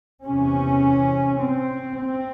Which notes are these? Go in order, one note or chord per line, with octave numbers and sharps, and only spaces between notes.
E2 C3 C#4
C4
C4